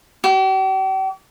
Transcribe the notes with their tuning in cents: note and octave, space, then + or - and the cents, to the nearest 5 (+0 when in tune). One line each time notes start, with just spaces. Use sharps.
G4 -45